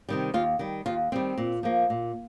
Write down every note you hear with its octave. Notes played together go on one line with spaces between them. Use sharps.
C3 D#3 G3
D#2 F4
D#3 G3
D#2 F4
D#3 G3 C4
A#2
F3 A#3
A#2